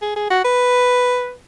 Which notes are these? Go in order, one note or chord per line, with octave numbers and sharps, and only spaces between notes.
G#4
G#4
F#4
B4